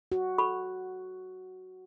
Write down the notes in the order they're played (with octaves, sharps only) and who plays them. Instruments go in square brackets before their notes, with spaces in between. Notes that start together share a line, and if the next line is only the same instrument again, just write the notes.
[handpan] F#4
[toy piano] A4 B5 C#6